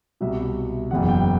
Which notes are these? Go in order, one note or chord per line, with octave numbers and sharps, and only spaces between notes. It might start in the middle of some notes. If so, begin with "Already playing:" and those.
C2 B2 E5
F#1 E2 B2 F#5
G5